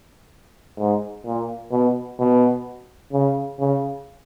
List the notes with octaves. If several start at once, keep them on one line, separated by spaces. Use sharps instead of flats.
G#2
A#2
B2
B2
C#3
C#3